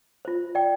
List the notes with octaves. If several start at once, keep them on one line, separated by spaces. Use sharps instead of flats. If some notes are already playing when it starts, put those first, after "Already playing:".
F4 C5
D5 G5